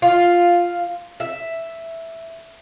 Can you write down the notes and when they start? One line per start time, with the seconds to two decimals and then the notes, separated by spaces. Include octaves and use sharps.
0.02 F4
1.20 E5